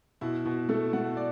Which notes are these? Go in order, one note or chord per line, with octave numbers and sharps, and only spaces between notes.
B2 E4
B2
A3 A4
A3 F#5
D5